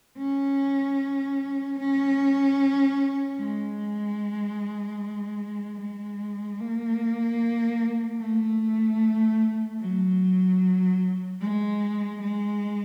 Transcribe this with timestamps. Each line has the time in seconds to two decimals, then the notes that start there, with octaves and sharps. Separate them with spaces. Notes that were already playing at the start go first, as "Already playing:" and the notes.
0.18 C#4
1.79 C#4
3.39 G#3
5.80 G#3
6.61 A#3
8.21 A3
9.81 F#3
11.41 G#3
12.21 G#3